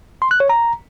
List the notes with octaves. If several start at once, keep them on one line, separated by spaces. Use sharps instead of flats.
C6
F#6
C#5
A#5